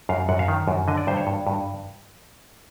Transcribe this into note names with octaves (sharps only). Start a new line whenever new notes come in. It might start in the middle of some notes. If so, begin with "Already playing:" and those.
F#2 F5
F#2 F#5
F5
D#3
F#2
D3 D#5
D5
G2 C5
C#5
G2
G2